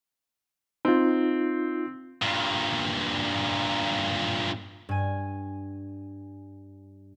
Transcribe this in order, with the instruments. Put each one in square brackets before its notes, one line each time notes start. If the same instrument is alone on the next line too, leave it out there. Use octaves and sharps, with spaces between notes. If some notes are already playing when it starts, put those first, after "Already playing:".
[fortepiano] C4 [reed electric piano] D#4 F4
[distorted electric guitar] G2 A#2
[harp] G2 G#5